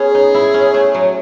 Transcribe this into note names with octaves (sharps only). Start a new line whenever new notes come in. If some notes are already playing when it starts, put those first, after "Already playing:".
Already playing: B3 C#4 G#4
D#4
E4
C#4
A3
F#3